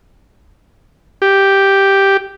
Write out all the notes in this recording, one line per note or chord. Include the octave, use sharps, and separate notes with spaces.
G4